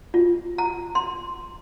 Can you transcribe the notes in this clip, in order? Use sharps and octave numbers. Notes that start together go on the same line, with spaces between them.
F4
A#5
C6